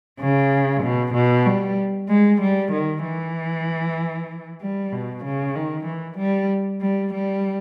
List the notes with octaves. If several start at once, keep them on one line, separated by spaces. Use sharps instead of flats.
C#3
B2
B2
G3
G#3
G3
D#3
E3
G3
B2
C#3
D#3
E3
G3
G3
G3